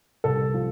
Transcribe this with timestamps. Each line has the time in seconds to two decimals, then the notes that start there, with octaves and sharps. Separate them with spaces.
0.24 C2 A4
0.54 F3